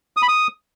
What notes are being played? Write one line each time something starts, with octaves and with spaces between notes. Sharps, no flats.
D#6
B5
D#6